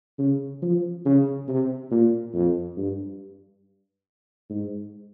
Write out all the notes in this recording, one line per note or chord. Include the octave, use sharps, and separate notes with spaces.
C#3
F3
C#3
C3
A#2
F2
G2
G#2